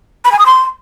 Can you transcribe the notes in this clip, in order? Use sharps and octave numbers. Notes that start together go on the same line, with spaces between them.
B5
G#5
D#6
C6